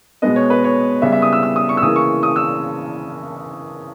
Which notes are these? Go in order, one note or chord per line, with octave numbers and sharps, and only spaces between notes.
B2 G#3 B3 D#5
C#5
B4
C#5
C#3 G3 B3 E5
E5
D#6
E6
E6
D#6
C#6
E6
C#3 E3 A#3 D#6
C#6
D#6
E6